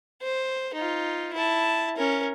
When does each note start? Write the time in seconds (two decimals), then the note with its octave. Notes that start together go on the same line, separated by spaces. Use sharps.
0.22 C5
0.74 D#4 F4
1.33 E4 A5
1.97 C#4 A#4